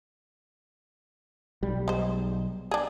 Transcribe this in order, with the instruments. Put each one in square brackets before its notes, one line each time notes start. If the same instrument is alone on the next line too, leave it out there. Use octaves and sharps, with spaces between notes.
[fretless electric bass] B1 G3
[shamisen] G#3 C5
D4 G#4